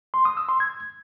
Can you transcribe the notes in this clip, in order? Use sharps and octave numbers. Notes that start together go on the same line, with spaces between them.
C6
D#6
E6
C6
G#6